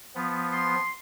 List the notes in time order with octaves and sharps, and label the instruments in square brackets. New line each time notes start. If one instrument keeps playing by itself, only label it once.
[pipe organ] F3 B3
[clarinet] C6